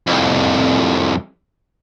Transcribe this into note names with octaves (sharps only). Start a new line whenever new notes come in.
C2 F2